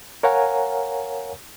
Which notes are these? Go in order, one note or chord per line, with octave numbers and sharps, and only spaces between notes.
A#4 C#5 F5 F#5 G#5 A#5